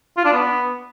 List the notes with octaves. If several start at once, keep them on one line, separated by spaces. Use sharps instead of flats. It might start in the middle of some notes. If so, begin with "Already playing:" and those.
F4
D4
B3